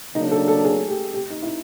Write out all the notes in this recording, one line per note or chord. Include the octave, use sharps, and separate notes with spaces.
C#3 F#3 A#3 D4 D#4
A4
A4
G#4
G4
G4
D#4
E4
D#4